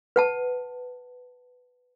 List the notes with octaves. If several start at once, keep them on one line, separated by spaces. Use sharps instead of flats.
B4 F#5 A5